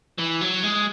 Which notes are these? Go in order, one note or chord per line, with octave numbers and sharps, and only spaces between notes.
E3
F#3
G#3